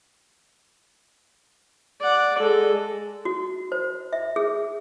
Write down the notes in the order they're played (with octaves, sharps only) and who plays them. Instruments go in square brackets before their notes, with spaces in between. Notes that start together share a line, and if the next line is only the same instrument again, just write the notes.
[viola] D5 F#5
G#3 A4
[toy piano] F#4
C5
E5
G#4